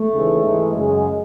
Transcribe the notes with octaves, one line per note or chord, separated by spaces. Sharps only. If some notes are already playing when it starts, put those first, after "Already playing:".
Already playing: A3
D#2 C#3 E3 G#3
G#2 E3 G#3
F#2 C#3 G#3